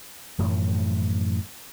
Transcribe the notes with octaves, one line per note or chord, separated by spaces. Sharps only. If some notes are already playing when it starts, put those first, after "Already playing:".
F#2 A2 E3 F3